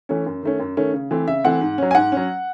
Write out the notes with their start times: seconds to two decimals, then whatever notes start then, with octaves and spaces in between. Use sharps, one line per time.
0.09 E3 A3 C#4
0.26 F#2
0.43 D#3 A3 C#4
0.60 F#2
0.77 D#3 A3 C#4
0.94 C#3
1.11 E3 A3 C4
1.27 C#3 E5
1.44 E3 A3 C4 F#5
1.61 G#2
1.78 F#3 C#4
1.91 G#5
1.95 G#2 F#5
2.12 F#3 C#4